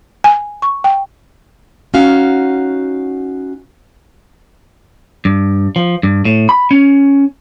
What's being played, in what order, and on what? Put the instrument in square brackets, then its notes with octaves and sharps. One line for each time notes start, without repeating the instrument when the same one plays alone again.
[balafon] G#5
C#6
G5
[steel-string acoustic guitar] C#4 D#4 F#4 F5
[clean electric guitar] G2
F3
G2
A2
B5
C#4